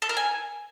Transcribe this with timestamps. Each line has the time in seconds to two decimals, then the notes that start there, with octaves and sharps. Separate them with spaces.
0.02 A4
0.09 A#4
0.17 G#5